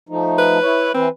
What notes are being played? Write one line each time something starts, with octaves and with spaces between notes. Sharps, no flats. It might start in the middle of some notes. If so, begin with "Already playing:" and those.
F3 A3 D#4
B4
E4 C#5
E3 C4 B4